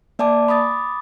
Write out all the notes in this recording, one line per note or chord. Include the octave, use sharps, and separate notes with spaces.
A#3 D5 G#5 A5 D6
B5 D6 D#6 A6